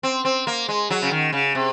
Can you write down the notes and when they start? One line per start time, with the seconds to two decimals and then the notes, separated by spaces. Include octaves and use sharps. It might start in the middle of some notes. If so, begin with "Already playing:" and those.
0.03 C4
0.25 C4
0.47 A#3
0.69 G#3
0.90 F#3
1.02 C#3
1.11 D#3
1.33 C#3
1.55 C3